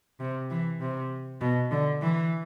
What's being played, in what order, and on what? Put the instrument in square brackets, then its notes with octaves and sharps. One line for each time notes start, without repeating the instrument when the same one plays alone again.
[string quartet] C3
E3
C3
B2
D3
E3